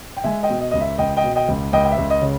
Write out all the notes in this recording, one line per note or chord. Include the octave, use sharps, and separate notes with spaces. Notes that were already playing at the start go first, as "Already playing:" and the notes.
G5
G#3 E5 G#5
D#5 G5
B2
D#5
C#2 D#5
E5
C#2 D#5 G5
D#5 G5
B2
D#5 G5
C#2
C#2 D#5 G5
G5
E5
C#2
D#5
C#3